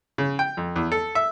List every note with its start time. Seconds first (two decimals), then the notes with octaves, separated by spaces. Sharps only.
0.18 C#3
0.39 G5
0.57 F2
0.76 E2
0.92 A4
1.15 E5